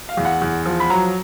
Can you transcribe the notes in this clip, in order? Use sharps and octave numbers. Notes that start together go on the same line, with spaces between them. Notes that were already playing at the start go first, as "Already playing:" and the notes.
F5
E2
F#5
E2
F3
B5
F#3 A#5